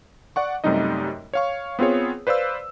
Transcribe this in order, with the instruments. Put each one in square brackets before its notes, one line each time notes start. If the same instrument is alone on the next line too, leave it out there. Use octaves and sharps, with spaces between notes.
[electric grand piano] D5 F#5 C#6
F#2 C3 G3 A3 D#4 D#5
C#5 F5 C#6
B3 C4 F4 G#4 C#5
B4 C5 D5 F5 E6